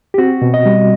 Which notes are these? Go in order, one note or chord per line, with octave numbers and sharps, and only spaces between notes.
G4
C4 F#4
B2
D#5
G3